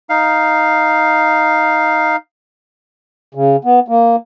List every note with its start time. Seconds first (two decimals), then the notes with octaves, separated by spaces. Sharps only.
0.10 D#4 F5
3.35 C#3
3.65 B3
3.88 A#3